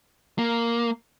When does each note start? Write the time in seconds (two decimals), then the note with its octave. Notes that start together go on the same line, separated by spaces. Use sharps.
0.38 A#3